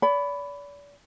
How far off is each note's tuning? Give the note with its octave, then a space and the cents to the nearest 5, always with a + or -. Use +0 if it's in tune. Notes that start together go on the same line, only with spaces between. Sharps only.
D5 -40 B5 +10